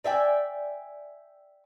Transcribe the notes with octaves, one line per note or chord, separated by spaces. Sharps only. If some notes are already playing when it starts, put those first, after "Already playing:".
D5 E5 G5 G#5